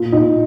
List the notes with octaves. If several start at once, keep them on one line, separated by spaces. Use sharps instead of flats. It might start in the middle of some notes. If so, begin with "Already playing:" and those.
Already playing: A#2
A#2 D#4